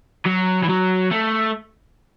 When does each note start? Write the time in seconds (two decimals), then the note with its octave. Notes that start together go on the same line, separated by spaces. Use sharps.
0.25 F#3
0.63 E3
0.69 F#3
1.11 A3